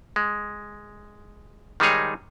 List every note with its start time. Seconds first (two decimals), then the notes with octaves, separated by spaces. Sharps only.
0.16 G#3
1.80 D#3 G3 G#3 D#4 G#4 C#5